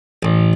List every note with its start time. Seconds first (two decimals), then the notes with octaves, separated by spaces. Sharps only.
0.23 A1